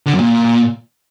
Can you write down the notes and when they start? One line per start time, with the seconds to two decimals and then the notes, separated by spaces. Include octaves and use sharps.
0.06 D3
0.13 F#2
0.20 A#2